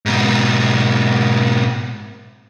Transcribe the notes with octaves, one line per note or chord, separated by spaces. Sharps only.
G#2 B2